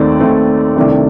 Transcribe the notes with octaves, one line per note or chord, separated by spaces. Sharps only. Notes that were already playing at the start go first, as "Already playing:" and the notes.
Already playing: D#2 D#3 A3 C4 D5
D#2 D#3 A3 C4
C2 C3 D#3 A3 D4